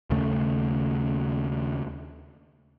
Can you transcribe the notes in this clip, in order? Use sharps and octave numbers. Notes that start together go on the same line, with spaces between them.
D#2 C#3 A3